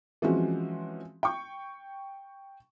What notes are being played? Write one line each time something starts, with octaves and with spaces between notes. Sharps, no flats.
E3 F3 G#3 C4 C#4 F#4
G5 C#6